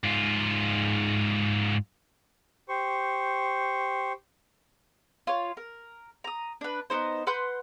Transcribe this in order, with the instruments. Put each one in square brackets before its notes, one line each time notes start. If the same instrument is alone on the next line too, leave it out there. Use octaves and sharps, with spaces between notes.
[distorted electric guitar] G#2 F4
[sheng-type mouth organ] G4 C5 C#6
[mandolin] F4 C#5
A#4
A#5 D#6
D4 B4
B3 C#4 D#4 C5
B4 F#5 C6 G6